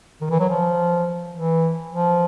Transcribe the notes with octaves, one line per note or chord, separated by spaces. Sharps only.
D#3
E3
F#3
F3
E3
F3